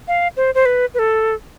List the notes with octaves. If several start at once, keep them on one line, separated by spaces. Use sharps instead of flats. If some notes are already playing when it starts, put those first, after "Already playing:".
F5
C5
C5
B4
B4
A4